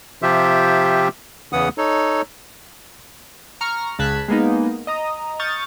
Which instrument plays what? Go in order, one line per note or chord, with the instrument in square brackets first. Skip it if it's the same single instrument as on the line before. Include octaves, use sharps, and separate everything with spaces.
[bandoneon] C3 F3 F4 G4 E5
E2 C#3 E3 B3 F#5 D#6
D#4 A4 C#5
[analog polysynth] A#5 C#6 F6
C#2 C#3 A5 F#6 G#6 B6
G#3 A#3 B3 D#4
D#5 A#5 D#6
C#6 D#6 F6 G6 A6